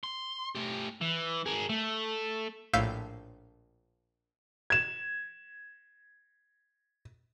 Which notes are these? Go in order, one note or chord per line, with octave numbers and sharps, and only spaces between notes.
C6
A3 G4
E3
G#4 A#4
A3
A#1 A2 F5 E6 G6 B6
G#6 E7